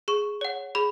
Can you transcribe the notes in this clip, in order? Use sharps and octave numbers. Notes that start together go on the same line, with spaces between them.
G#4 C#6
C#5 F#5
G#4 B5